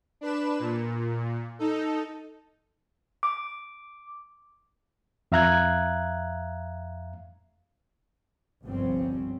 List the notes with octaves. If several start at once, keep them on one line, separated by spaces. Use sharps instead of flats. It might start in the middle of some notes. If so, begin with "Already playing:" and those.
D4 B4 E7
A#2
D#4 A4
D6
F2 E5 F5 A#5 F#6 G#6
G1 C2 F3 G3 C4 C#4